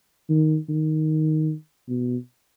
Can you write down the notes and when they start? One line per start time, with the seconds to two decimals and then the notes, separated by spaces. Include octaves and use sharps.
0.30 D#3
0.69 D#3
1.89 B2